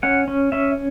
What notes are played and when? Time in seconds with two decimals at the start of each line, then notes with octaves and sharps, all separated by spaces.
0.03 C#4 F#5
0.28 C#4
0.52 C#4 E5